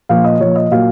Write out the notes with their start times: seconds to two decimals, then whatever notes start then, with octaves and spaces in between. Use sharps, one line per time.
0.09 A#2 F3 F5
0.24 D#5
0.40 A#2 F3 C#5
0.56 D#5
0.71 A#2 F#3 F5